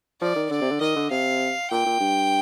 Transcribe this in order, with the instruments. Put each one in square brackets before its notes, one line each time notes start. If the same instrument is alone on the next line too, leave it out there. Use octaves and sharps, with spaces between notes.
[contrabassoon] F3 [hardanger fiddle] D5
[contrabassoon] D#3
[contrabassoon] D3 [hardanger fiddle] D5
[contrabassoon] C3
D3
[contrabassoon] D#3 [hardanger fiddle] D#5
[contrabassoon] D3
[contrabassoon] C3 [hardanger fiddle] F5
[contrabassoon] A#2 [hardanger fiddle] G5
[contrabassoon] A#2
G2